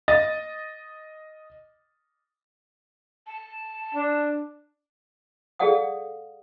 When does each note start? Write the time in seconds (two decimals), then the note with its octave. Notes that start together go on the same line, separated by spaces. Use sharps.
0.08 D#5 A6
3.27 A5
3.95 D4
5.59 G#4 A4 D5 F5 F#5 D#6